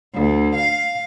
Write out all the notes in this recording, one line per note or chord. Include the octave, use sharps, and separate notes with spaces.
D2
F5